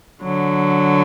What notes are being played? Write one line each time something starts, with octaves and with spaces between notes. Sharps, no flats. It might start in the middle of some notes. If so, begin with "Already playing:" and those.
D3 F#3